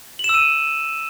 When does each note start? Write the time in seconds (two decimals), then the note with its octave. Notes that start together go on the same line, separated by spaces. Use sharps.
0.19 F#7
0.24 E7
0.29 E6
0.34 D#7